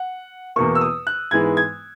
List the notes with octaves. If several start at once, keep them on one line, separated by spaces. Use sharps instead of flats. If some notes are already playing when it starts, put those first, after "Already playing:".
Already playing: F#5
E2 B2 A#3 C#6
E6
D#6
F#6
G#2 E3 G#3 B3 G#6
G#6